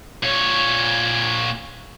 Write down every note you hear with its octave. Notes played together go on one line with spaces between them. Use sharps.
A#2 C#5